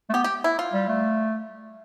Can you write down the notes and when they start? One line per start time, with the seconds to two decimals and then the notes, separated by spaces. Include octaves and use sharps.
0.09 A3
0.13 B3 G4
0.24 G4
0.44 E4
0.59 F4
0.73 G3
0.88 A3